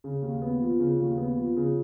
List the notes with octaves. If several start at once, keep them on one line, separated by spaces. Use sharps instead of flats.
C#3
D#2
B3
F3
C#3
D#2
B3
F3
C#3